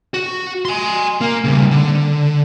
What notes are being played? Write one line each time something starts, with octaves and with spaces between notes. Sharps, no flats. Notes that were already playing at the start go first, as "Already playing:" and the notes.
F#4
G#5 C6
A#3
C#3 G3
D3